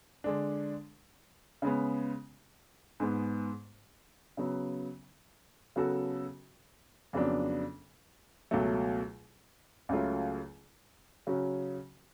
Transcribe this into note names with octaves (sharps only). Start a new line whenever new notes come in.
D3 G#3 D4
C#3 G#3 B3
G#2 G#3 B3
C#3 F#3 B3
C#3 F#3 B3 F#4 A4
F2 C#3 F#3 B3 D4
C#2 B2 F#3 A3
C#2 C#3 F#3 A3 F4
C#3 F#3 C#4 F#4